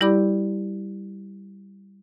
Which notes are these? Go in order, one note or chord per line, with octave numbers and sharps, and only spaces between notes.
G3 E4 G4 D5 B5 D6